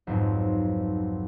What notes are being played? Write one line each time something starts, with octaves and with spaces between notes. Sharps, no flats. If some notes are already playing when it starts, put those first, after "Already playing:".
B1 F2 G#2